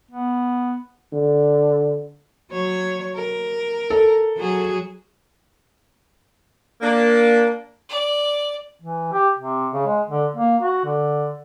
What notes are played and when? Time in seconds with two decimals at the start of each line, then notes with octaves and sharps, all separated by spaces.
0.11 B3
1.13 D3
2.51 F#3 C#5
3.15 A#4
3.90 A4
4.37 F#3 F#4 G#4
6.81 A#3 D4
7.89 D5
8.82 E3
9.13 G4
9.38 C3
9.74 C#3
9.87 G#3
10.10 D3
10.36 A#3
10.62 F#4
10.85 D3